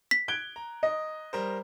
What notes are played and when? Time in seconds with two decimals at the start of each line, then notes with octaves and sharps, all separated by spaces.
0.11 B6
0.28 F#6 G#6 D7 G7
0.56 A#5
0.83 D#5
1.33 G3 A#4 C5